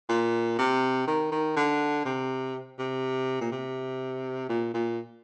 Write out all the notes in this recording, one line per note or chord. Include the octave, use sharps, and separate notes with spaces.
A#2
C3
D#3
D#3
D3
C3
C3
A#2
C3
A#2
A#2